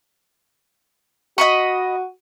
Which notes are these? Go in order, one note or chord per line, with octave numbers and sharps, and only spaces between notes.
F#4 D#5 B5 C#6